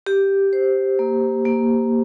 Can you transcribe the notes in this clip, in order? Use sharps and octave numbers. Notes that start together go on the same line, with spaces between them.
G4
C5
A#3
A#3